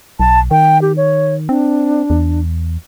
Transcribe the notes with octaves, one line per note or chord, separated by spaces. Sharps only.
B1 A5
D#3 G5
G4
C#5
C4 D4
E2